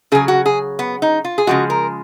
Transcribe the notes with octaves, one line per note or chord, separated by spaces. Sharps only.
C#3 F#3 G#4
F#4
G#4
B3
D#4
F4
G#4
C#3 F3 G#3 F#4
A#4